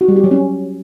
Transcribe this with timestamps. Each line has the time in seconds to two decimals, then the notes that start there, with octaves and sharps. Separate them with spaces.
0.01 F#4
0.08 G3
0.16 G4
0.24 F#3
0.31 C#4